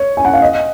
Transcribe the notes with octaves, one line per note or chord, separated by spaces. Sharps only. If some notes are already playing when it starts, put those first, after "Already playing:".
Already playing: C#5
G#5
F#5
F5
D#5